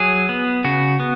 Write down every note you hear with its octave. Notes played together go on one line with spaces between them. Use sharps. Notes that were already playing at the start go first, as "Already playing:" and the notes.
Already playing: F#3 G#4
B3
C#3 F#4
B3